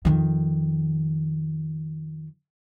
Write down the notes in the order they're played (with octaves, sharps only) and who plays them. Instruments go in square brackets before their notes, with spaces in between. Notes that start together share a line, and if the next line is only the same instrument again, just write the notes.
[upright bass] F2 D#3